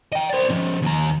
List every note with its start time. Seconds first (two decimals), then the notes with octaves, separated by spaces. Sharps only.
0.12 D#5 G5
0.29 C5 D5
0.49 F3 C#4
0.82 D#2 A#5